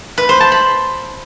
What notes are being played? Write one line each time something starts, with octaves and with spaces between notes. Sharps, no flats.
B4
C5
A5
B5